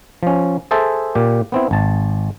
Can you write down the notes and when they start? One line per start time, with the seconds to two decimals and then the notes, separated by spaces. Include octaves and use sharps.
0.23 F3 C#4
0.71 G#4 A4 C5 E5 A5
1.15 A#2 G4
1.52 B3 C4 E4
1.71 G#1 A5